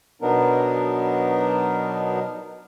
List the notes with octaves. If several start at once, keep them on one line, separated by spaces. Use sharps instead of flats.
B2 F#3 B3 D4 D#4 A#4